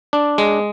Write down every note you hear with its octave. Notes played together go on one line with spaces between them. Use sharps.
D4
G#3